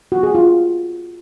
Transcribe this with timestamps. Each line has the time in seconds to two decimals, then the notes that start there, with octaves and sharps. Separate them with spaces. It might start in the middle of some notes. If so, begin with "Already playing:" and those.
0.12 F#4
0.23 G#4
0.35 F4